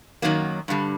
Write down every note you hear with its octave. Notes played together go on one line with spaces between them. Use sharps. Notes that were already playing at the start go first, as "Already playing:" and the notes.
F#2 D#3 F#3 A#3
G2 D3 G3